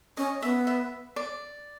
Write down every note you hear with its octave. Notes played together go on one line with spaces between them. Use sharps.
C#4 D#5
B3 E5
E5
D5